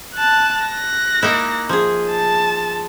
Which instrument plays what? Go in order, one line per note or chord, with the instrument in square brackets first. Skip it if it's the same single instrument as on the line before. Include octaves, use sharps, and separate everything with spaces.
[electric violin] A5 F#6
F#6 A#6
[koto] A#3 D#4 E4
F3 G#4
[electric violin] A5